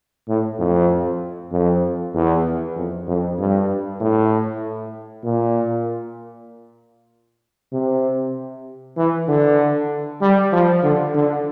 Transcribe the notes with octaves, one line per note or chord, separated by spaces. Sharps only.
A2
F2
F2
E2
F2
F2
G2
A2
A#2
C3
E3
D3
G3
F3
D3
D3